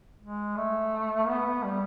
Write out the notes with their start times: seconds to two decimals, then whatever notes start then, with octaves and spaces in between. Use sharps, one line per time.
0.22 G#3
0.57 A3
1.26 B3
1.45 B3
1.63 G3